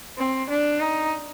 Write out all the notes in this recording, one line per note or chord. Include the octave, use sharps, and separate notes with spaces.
C4
D4
D#4